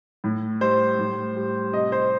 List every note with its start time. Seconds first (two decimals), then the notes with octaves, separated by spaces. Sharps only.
0.24 A2
0.61 G3 C5
0.99 A2
1.36 G3
1.73 C3 D#5
1.92 C5